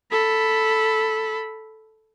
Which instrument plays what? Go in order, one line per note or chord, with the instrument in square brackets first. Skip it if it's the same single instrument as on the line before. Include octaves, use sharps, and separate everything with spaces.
[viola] A4 B5